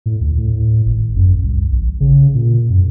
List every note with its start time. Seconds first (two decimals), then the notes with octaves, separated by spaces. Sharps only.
0.06 A2
0.21 D2
0.37 A2
0.86 G#1
1.16 F#2
1.44 C2
1.72 A1
2.00 C#3
2.35 A#2
2.70 F#2